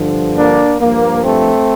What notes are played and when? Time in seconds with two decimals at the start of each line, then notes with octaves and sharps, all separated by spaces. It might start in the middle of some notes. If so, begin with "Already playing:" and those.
Already playing: G2 D3 F3
0.37 A#3 D4
0.80 G2 F3 A#3
1.24 A3 C4